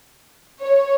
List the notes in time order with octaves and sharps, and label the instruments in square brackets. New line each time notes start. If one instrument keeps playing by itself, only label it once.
[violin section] C#5